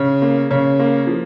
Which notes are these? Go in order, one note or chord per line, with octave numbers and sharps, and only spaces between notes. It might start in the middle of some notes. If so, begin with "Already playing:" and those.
Already playing: C#3
A#3
C#3
A#3
F3